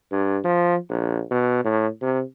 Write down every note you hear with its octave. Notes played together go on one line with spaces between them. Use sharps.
G2
F3
A#1
B2
A2
C3